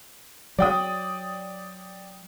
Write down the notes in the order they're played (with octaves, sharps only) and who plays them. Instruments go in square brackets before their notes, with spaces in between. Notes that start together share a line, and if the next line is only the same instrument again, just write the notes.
[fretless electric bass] F#3 [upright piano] D5 G5 D#6